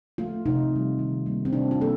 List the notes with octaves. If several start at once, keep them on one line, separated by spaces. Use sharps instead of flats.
A3 F4
C3 D#4
D#3 G3
D#3
G3 A#3
C4
C3 D4
F4
G3 A#3 A4